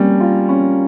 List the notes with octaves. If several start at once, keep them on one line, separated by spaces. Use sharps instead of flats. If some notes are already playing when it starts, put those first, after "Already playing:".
Already playing: G3 A#3 C#4
F4
C#4